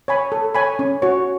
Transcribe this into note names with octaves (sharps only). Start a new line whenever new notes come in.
C#5 G#5 B5
A4
C#5 G#5 B5
C#4
F#4 C#5